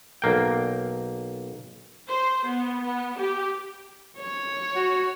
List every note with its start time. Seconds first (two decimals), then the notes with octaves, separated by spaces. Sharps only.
0.22 B1 A#3 G5
2.08 C5
2.46 B3
2.83 B3
3.19 G4
4.18 C#5
4.76 F#4